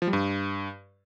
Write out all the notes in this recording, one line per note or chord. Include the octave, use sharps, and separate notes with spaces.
F3
G3
G2